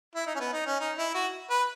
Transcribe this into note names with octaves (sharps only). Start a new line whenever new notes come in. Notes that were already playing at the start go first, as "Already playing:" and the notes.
E4
D#4
C#4
B3
D#4
C#4
D#4
E4
F#4
B4